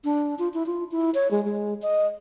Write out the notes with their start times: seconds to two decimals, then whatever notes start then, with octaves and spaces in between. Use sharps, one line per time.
0.04 D4
0.39 F4
0.54 E4
0.66 F4
0.91 E4
1.14 C#5
1.31 G#3
1.45 G#3
1.82 D#5